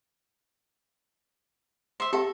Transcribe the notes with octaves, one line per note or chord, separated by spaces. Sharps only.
C5 E5
G4 A4 E5